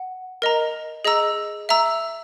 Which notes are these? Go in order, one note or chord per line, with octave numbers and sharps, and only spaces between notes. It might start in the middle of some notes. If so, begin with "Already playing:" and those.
Already playing: F#5
A#4 D#5 A#5
G#4 D#5 A#5 E6
E5 A#5 E6